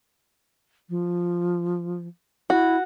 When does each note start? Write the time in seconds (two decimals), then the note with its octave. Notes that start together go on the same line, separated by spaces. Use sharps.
0.89 F3
2.50 E4 F#4